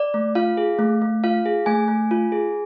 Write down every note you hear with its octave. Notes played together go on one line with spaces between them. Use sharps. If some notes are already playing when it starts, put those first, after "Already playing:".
Already playing: D5
A3
F4 F5
G#4
A3
A3
F4 F5
G#4
A3 G#5
A3
F4
G#4